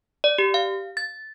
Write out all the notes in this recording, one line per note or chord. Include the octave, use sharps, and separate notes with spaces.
D5
G4
F5
A6